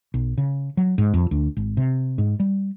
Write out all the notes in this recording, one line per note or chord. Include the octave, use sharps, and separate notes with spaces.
B1
C#3
F#3
G#2
F2
D2
G#1
C3
G#2
G3